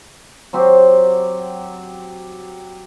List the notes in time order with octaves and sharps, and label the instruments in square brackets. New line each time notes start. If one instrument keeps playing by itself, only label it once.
[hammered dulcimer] F#3 C4 G4